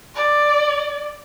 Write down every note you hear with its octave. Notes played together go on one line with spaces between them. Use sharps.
D5